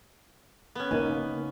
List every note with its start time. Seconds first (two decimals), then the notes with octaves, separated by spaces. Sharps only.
0.75 B3 C#4
0.91 C#3 A#3 D#4 G#5